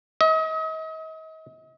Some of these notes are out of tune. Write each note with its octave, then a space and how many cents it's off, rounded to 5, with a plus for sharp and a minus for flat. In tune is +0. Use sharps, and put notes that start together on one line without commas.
D#5 +40